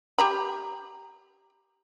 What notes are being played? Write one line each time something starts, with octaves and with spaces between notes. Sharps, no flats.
G4 A#5 B5